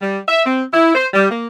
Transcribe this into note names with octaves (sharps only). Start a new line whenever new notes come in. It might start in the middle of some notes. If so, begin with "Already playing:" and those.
G3
E5
C4
E4
C5
G3
A#3